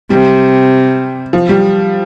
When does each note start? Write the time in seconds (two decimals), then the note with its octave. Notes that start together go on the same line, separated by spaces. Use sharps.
0.10 C3 G3
1.33 F3
1.49 G3